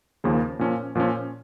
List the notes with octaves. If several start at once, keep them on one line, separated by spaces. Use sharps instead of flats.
D#2 C#3 F3 A#3
A#2 F3 C#4
A#2 F3 C#4